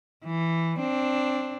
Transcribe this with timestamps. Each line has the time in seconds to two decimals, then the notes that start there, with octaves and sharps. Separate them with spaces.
0.24 E3
0.79 C4 D4